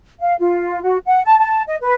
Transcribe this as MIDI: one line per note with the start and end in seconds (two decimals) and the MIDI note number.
0.21 0.34 77
0.39 0.81 65
0.82 0.97 66
1.06 1.21 78
1.25 1.35 81
1.38 1.62 81
1.67 1.76 75
1.81 1.94 71